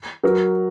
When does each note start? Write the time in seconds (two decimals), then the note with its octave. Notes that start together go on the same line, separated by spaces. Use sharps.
0.24 F#3 A#4